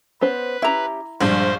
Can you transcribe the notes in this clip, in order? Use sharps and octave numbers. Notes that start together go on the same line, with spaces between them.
B3 C#4 B4 C5
C#4 E4 G4 E5 A#5
A#1 G2 G#3 D4 C5